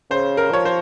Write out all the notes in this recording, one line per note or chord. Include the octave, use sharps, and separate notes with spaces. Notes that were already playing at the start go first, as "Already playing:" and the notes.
C#3 C5
A#4
F3 C#5
C5